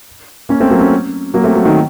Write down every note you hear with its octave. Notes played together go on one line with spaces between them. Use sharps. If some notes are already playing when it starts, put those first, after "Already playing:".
A#3 C#4
A3 C4
F#3 A#3
A#3 C#4
F#3 A#3
A3 C4
F#3 A#3
D#3 F#3